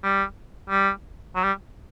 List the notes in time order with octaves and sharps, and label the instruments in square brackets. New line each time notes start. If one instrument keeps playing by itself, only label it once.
[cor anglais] G3
G3
F#3
G3